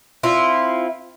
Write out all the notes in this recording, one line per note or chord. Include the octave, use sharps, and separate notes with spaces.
C4 E4 F4